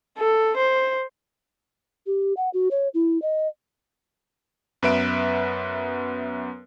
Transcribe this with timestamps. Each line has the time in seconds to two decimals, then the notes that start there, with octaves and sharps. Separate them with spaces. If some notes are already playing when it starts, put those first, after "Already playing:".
0.18 A4
0.56 C5
2.07 G4
2.37 F#5
2.54 F#4
2.71 C#5
2.94 E4
3.22 D#5
4.83 F#2 B3 B4 E5 D7